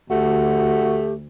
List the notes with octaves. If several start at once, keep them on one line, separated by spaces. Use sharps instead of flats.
D2 A3 F#4 G4